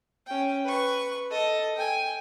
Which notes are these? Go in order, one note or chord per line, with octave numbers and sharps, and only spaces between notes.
C#4 G5
B4 C#6
A4 D#5
G5 G#5